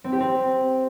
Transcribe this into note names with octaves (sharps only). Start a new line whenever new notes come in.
C4
G4
C4